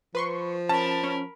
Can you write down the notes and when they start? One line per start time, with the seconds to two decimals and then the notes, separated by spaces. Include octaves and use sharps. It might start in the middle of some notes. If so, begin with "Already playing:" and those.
0.15 F3 B4 C6 C#6
0.69 C#4 A#4 A5 B5
1.04 C#4